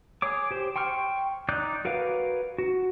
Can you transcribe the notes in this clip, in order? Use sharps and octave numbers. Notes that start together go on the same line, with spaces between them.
G#4 C#5 D6
G4 C5
G5 C6 C#6 F6
D#4 D5 D6 F#6 G6
F#4 A#4 B4 C#5 F5
F#4